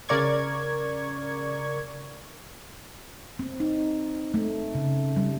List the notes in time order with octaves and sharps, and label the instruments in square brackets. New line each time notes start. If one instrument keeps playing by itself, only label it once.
[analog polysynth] C#3 A#4 D5 C#6 G#6
[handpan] C4
D#4
A3
C#3
G3